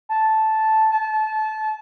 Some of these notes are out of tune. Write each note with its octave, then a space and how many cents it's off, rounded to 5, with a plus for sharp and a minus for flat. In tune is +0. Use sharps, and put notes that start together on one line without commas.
A5 -5
A5 -25